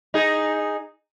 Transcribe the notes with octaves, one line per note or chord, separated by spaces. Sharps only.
D#4 G#4